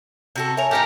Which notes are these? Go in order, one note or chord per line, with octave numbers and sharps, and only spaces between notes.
C3 F#4 A4
A#4 C#5 E5 G#5 F7
A2 D#4 G4 A#4 A#5